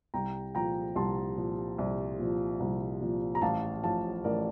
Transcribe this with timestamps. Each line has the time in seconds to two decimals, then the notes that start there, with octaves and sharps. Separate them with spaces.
0.14 C2 G5 A#5
0.55 A#2 F3 G5 A#5
0.95 C2 A5 C6
1.37 A#2 F3
1.78 C2
2.19 A#2 F3
2.60 C2
3.01 A#2 F3
3.35 A#5
3.42 A1 F5 A5
3.83 A2 F3 F5 A5
4.24 A1 A#4 D5